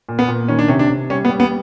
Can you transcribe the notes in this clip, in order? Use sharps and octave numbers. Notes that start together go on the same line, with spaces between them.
A#2
B3
A#2
D#3 C#4
D4
C3 C#4
D4
C3
G3 C#4
B3
G3
B3